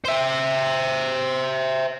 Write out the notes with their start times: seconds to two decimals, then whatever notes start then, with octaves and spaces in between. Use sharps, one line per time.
0.05 C5 E5